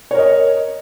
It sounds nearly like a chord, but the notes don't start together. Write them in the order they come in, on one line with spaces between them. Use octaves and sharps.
C#5 A#4 D#5